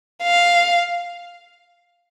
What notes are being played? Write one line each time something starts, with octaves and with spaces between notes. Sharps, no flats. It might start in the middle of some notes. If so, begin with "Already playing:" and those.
F5